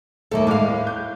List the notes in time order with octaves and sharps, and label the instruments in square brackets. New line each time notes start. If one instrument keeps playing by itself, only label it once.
[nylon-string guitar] D#2 A3 A#3 [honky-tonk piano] A4
[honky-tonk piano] A2 G#3 D6 [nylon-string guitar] E4 F5
[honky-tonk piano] G6